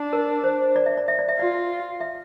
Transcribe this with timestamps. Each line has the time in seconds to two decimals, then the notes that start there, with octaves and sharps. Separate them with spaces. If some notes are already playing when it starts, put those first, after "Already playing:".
Already playing: D4
0.13 A#4
0.44 C5
0.76 D5
0.86 E5
0.97 D5
1.08 E5
1.19 D5
1.28 E5
1.38 F4 D5
2.00 E5